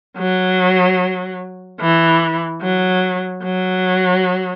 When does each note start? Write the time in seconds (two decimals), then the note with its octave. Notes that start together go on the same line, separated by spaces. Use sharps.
0.17 F#3
1.80 E3
2.62 F#3
3.43 F#3